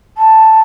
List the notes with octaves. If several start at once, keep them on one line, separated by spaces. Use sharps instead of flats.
A5